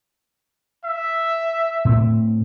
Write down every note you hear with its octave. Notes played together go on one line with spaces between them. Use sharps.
E5
A2 C4